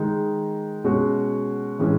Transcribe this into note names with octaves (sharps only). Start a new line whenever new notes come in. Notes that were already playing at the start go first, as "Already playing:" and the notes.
Already playing: D#3 G#3 D#4
B2 G#3 C#4 F#4
A2 E3 G#3 C#4